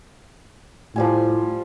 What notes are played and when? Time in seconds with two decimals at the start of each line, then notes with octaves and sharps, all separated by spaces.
0.96 A2 F3 G3 G#5